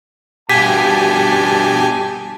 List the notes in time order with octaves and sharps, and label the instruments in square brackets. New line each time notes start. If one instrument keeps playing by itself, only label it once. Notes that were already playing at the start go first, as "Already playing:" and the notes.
[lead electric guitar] G2 B2 [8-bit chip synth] G4 G#5 [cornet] A5 [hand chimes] B6